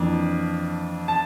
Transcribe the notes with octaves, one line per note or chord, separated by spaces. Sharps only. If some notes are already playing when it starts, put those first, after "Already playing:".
Already playing: F2 E3 A#3 D4
A5